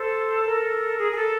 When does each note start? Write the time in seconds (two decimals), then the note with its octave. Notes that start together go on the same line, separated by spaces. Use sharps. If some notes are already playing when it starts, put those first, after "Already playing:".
Already playing: A4 C5
0.45 A#4
0.98 G#4
1.12 G#4
1.16 A4